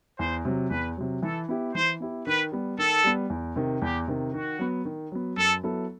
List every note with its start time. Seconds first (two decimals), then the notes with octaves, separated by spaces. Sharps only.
0.19 E2 C5
0.45 C3 F#3
0.70 E2 B4
0.97 C3 F#3
1.22 E3 A4
1.48 B3 E4 G4
1.74 E3 C5
2.00 B3 E4 G4
2.26 D#3 B4
2.52 G3 B3
2.78 D#3 A4
3.04 G3 B3
3.30 E2
3.56 C3 D#3
3.82 E2 G4
4.08 C3 D#3
4.33 D#3 F#4
4.59 F#3 B3
4.85 D#3
5.12 F#3 B3
5.37 F#2 A4
5.63 F#3 B3 E4 A4